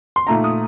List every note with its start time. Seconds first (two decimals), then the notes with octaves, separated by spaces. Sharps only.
0.16 C6
0.27 A#2 A3 D#4 A#5
0.44 D#6